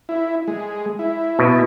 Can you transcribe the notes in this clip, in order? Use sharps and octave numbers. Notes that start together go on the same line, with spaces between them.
E4
G#3
E4
B2